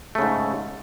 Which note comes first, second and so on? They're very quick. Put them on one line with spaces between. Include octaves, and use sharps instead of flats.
A3 C#3 G#2